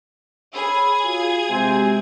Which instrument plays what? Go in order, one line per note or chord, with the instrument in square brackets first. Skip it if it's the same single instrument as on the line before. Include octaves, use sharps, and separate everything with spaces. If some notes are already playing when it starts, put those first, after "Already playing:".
[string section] G#4 G#6 [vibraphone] C#5 B5 E6
[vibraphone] F4 F#4 F5
[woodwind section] C3 C4 G#5 [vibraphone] G#3 F#4